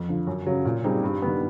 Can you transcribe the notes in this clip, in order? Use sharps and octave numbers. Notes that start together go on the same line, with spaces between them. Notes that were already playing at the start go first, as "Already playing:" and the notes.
Already playing: F2
D3 F3
F#2
C#3 F#3
A#2
G3 C4 D#4 G#4
G2
D#3 G3 B3